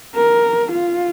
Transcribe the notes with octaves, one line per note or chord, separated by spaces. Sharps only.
A#4
F4